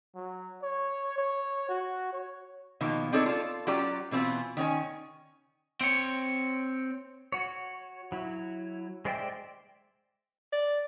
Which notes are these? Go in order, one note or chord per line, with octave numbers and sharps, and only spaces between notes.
F#3
C#5
C#5
F#4
C#5
B2 D#3 F3 A#3
C4 D4 D#4 A4 C#5
F4 A4
F#3 C#4 F4 G4 D5 A#5
B2 E3 C4 F4 B4
D#3 C#4 C#5 G#5
C4 C#5
F#4 C#5
F#3 E4
G#3 C5 D5 E5 G5
D5